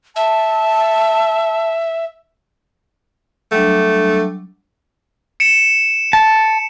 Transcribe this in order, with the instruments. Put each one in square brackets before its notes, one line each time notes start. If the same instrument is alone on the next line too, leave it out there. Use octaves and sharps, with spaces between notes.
[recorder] E5 [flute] A5
[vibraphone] F#3 G3 D4 [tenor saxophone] A3
[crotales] C#7 D7 E7
[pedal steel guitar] A5